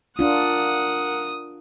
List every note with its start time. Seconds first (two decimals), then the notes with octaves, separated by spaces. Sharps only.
0.19 D4 F4 A#4 F#5 D#6